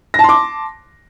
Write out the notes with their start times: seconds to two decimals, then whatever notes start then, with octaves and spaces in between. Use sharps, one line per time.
0.14 A#6
0.19 A5
0.24 C6
0.29 D6